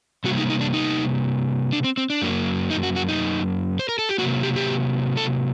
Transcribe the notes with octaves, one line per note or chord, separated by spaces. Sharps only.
C3 G3 A#3 F#4
D#4
D#4
D4
D#4
D4
C4
C4
D4
F#2 F#3 A#3
D#4
F#4
F#4
D#4
C5
A#4
A4
G4
C3 F#3 A#3 F#4
G4
G4
A4